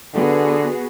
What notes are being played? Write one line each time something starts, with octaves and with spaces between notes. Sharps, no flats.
D3 B3 F#4 G#4